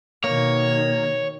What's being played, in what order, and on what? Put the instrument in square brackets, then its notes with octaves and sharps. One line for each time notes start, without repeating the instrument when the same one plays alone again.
[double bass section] B2 D#3 [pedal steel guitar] A#3 [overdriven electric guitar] C#5